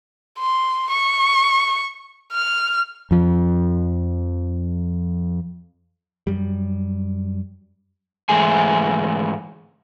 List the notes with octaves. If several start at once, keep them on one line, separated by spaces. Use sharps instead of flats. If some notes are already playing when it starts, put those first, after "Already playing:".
C6
C#6
F6
F2 F3
F#2 G3
G#2 E3 A3 G#4 G#5